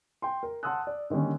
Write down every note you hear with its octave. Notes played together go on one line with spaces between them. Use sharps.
G5 C6
A#4
F#5 A5 C6 D#6 E6 F#6
D5
D3 D#3 G3 A#3 C#4